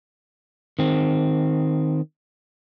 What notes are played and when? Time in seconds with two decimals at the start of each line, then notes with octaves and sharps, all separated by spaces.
0.79 D#3 C4